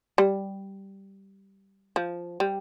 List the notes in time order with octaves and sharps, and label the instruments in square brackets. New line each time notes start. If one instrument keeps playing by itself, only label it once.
[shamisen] G3
F3
G3